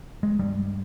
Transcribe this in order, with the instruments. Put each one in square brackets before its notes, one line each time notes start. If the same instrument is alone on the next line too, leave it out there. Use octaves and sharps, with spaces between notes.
[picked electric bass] G#3
G2 G3